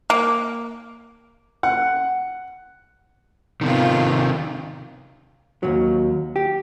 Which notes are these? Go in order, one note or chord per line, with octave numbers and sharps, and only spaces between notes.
A#3
F#5
C3 D#3 B3 F4
D#2 G#2 F#3
G4